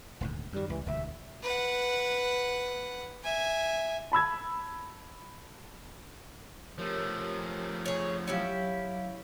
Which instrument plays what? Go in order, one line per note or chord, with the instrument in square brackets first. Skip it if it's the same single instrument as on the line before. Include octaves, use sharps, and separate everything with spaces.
[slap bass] D#1 D2 G#2
[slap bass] F#2 D#3 [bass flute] G3
[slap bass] C#2 [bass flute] E3
[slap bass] E1 D2 [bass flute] E5
[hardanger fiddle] B4 F#5
E5 G#5
[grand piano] A5 B5 E6 G#6
[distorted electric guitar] F3 A3 [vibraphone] G4 A#4 C#5
[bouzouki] G#4 C#5
[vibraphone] F#3 F5 [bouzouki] C#4 E4 G4